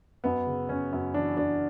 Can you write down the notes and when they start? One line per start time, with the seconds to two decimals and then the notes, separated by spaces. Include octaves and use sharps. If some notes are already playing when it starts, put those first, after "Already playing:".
0.24 F#2 B3
0.46 C#3
0.69 F#2 C#4
0.93 F#2
1.14 E3 D4
1.37 F#2 D4